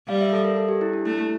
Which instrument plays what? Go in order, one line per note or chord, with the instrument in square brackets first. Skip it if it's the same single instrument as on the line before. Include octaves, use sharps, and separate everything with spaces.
[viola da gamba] G3 [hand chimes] F5
[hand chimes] E5
A4
A#4
A4
G4
E4
D4
[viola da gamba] A3 [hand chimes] E4